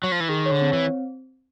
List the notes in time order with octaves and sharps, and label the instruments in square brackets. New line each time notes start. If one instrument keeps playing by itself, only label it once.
[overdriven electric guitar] F#3
F3
E3
[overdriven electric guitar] D#3 [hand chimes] G#4
[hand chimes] C#5
[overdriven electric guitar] D3
[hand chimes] C4
[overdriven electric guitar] E3